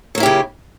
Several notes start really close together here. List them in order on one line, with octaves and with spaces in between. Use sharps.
F#3 A#3 E4 G4 C#3